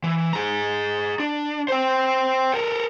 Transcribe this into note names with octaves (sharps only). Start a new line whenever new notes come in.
E3
G#4 A#5
D4
C5 G5
A4 A#4